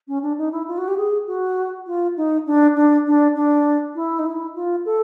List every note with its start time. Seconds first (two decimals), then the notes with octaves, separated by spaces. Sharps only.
0.07 C#4
0.22 D4
0.37 D#4
0.52 E4
0.67 F4
0.77 F#4
0.87 G4
0.96 G#4
1.26 F#4
1.86 F4
2.16 D#4
2.46 D4
2.75 D4
3.06 D4
3.35 D4
3.95 E4
4.18 D#4
4.25 E4
4.55 F4
4.85 A4